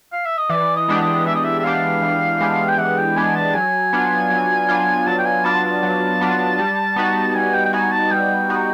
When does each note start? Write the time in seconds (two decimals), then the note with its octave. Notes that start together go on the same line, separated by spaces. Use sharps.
0.12 F5
0.25 E5
0.37 D#5
0.50 E3 D5
0.76 D#5
0.88 G#3 B3 D4 G4
1.01 D#5
1.26 E3 E5
1.35 D#5
1.44 E5
1.59 E5
1.64 G#3 B3 D4 G4 F5
2.02 E3
2.41 G#3 B3 D4 G4
2.69 G5
2.78 E3 F#5
2.98 G5
3.16 G#3 B3 D4 G4 G#5
3.35 A5
3.54 F#3 G#5
3.93 B3 D4 F4
4.30 F#3
4.69 B3 D4 F4
5.07 F#3 A5
5.18 G5
5.26 G#5
5.44 B3 D4 F4 A5
5.64 A5
5.83 F#3
6.21 B3 D4 F4
6.59 G3
6.96 B3 D#4 F#4
7.35 G3 G#5
7.54 G5
7.65 G5
7.73 B3 D#4 F#4 G#5
7.92 A5
8.11 G3 G5
8.49 B3 D#4 F#4